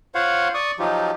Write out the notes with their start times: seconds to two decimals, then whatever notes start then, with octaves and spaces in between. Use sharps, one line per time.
0.15 F4 C5 C#5 F5 F#5
0.54 D5 C#6 D#6
0.79 F3 F#3 D#4 F4 G4